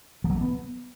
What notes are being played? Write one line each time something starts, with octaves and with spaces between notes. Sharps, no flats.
F3
F#3
A3
B3